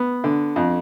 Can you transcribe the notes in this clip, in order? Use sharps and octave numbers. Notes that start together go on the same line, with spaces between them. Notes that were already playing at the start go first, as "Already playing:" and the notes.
Already playing: B3
D3
F2